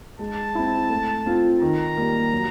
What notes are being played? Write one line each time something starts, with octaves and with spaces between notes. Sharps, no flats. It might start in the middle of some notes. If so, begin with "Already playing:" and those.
G#3 A5
C4 E4
A3
C4 F4
D#3 A#5
G3 A#3
F#3